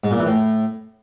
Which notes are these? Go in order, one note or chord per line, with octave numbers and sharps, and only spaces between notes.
G#2
A#2
E3
A2